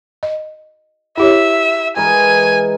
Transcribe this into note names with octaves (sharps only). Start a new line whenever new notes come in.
D#5
E4 G4 C#5 E5
E3 G#3 A#4 G#5